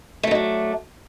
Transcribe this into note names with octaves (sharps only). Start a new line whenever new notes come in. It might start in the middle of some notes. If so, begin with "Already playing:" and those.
F#3 A3 D4 D#4